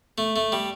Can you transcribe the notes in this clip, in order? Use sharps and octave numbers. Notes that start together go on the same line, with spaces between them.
A3
A3
G3